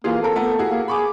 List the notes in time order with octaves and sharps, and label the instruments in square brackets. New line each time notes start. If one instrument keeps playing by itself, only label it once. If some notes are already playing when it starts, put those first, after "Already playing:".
[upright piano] E3 F4 G#4 [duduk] A#3
[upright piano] C4 A#4 [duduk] A4
[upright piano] A3 B3 A#4
E4 F#4 G#4
[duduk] A#3
[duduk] G#4 [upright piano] B5 C#6 D6